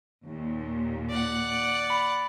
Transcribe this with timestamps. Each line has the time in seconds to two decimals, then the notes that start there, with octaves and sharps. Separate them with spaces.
0.24 D#2 A#2
1.10 D5 F#5
1.90 B5